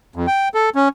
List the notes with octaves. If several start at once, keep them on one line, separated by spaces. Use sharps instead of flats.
F2
G5
A4
C#4